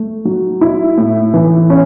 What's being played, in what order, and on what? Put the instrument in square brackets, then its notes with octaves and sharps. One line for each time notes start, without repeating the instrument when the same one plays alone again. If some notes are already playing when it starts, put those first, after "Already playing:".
Already playing: [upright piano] A3
F#3
E4
A2
E3
C#4